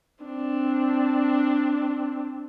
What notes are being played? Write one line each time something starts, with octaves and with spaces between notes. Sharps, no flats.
C4 D4